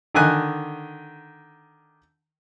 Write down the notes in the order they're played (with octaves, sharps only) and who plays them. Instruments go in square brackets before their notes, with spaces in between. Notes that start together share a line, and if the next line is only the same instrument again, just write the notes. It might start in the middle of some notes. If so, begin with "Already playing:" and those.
[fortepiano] D3 D#3 G#5 F#6